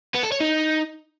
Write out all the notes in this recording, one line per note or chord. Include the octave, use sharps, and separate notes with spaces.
B3
A4
C#5
D#4